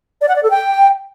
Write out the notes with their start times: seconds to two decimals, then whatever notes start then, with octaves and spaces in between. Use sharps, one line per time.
0.21 D5
0.28 F#5
0.35 D5
0.43 A4
0.50 G5